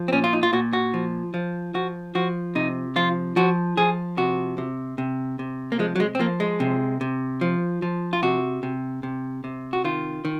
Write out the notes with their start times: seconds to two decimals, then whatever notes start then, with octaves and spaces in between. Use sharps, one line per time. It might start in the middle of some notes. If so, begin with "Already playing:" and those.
Already playing: F3
0.08 C4
0.12 A#2 C#4
0.24 F4
0.33 D#4
0.43 F4
0.53 A#2 F#4
0.73 F#4
0.94 F3
1.34 F3
1.74 F3 F#4
2.15 F3 F#4
2.55 C3 D#4
2.96 F3 F4
3.36 F3 F#4
3.77 F3 G#4
4.17 C3 F#4
4.58 C3
4.98 C3
5.39 C3
5.72 A#3
5.79 F3 G#3
5.96 F#3
6.00 G#3
6.15 C4
6.19 F3 A#3
6.40 G#3
6.60 C3
7.01 C3
7.41 F3
7.82 F3
8.13 F4
8.23 C3 F#4
8.63 C3
9.03 C3
9.44 C3
9.73 F#4
9.84 D#3 F4
10.25 D#3